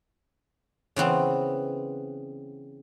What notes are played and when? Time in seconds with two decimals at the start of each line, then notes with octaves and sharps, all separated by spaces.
0.96 C#3 E3 B3 C4